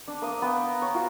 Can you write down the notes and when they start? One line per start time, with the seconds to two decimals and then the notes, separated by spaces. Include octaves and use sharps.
0.08 D4
0.22 A#3 C5 D#6
0.42 B3 G5
0.64 A#5
0.82 C#5
0.94 F4 F#4 C5